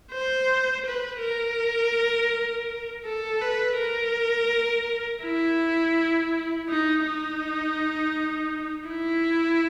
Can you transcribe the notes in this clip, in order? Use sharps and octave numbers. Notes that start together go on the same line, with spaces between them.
C5
B4
A#4
A4
B4
A#4
E4
D#4
D#4
E4